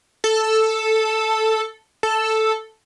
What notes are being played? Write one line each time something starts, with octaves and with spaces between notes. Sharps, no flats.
A4
A4